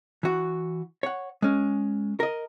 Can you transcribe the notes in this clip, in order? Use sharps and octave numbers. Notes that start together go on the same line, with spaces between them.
E3 F#4
C#5 F#5
G#3 C#4
A#4 D#5